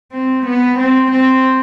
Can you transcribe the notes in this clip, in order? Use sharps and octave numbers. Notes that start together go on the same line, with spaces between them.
C4
B3
C4
C4